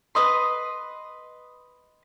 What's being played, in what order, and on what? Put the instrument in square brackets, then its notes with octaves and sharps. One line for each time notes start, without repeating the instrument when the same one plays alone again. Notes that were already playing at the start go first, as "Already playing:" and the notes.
[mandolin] B4 D#5 C6